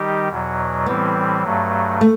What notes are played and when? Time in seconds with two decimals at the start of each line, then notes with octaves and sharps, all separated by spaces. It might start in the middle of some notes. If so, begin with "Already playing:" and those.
Already playing: D#3 G3 D#4 G4
0.28 E2 B2 F#3
0.86 A2 E3 G3 B3 C4
1.43 G2 F#3 A3
2.01 A3